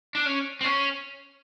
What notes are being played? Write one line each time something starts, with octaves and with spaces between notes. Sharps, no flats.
D4
C#4
C4
C#4